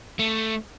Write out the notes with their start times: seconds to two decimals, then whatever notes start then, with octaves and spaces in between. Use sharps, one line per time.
0.19 A3